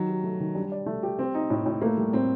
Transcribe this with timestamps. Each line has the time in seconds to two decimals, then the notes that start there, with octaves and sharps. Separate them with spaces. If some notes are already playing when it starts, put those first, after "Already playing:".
Already playing: D#3 F#3 D#4
0.08 G4
0.24 A3
0.40 D#3
0.55 G3 D4
0.72 D5
0.86 A3
1.03 G4
1.19 C4
1.35 D#4
1.50 A2
1.66 A2
1.82 A3 A#3
1.97 G3
2.13 A2 C4